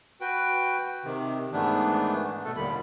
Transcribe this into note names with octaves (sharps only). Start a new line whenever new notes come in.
F#4 B4 G5
C3 D#3
G#2 D#3 E3 A3 B3 D4
B2 A3 A4
D#2 A#2 D3 D#3 G3 B5